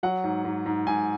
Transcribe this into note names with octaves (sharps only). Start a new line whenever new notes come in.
F#3 F#5
G#2
G#2
G#2
G#2 G#5